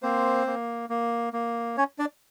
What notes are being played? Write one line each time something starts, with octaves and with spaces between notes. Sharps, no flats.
A#3 C4 C5
A#3
A#3
A#3
C#4 C#5
D4 D5